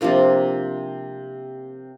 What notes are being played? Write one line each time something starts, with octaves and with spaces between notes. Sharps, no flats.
C3 F3 A#3 D4